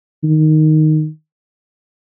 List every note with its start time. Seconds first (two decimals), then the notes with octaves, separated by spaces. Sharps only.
0.24 D#3